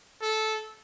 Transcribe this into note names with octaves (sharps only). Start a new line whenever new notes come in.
A4